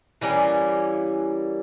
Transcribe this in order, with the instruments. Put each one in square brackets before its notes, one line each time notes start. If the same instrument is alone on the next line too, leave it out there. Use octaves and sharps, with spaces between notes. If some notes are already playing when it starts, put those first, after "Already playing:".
[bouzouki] E3 G3 A#3 C#4